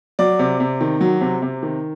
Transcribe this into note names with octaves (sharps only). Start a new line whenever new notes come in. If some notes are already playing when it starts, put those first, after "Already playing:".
F#3 D5
C3
C3
D#3
F#3
C3
C3
D#3